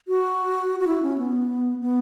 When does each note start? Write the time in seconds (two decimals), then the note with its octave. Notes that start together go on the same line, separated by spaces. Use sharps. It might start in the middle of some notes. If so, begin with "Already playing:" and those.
0.08 F#4
0.79 F#4
0.87 E4
1.03 C#4
1.18 B3
1.81 B3